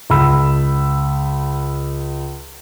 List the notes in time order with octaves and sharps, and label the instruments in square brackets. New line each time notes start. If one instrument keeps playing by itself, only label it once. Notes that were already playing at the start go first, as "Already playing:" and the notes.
[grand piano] C#2 B5 E6